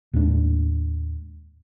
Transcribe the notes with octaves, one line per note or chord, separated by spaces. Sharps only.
D#2 A2 G#3 D4